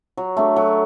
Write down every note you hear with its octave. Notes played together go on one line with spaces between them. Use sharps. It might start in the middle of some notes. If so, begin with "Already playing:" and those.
F#3
A3 D4
F#3